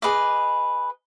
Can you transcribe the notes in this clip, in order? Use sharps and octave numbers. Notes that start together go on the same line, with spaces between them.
G#4 B4 D#5 D6